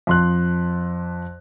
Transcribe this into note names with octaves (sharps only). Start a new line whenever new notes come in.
F2 C6 F#6